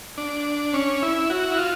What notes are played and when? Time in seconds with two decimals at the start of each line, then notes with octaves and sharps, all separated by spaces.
0.18 D4
0.74 C#4
1.02 E4
1.30 F#4
1.51 E4
1.58 F4